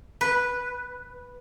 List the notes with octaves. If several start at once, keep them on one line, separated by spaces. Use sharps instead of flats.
B4